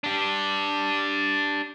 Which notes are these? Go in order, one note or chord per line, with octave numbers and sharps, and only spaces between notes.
D4 G4